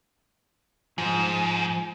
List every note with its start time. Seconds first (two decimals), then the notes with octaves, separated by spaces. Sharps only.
0.98 G#2 F3